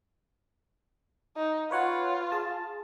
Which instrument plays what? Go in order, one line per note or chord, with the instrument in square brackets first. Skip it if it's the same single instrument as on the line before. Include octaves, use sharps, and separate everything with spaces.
[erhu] D#4
[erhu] F4 [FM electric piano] B4 C#5 F#5
[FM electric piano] G#4 A5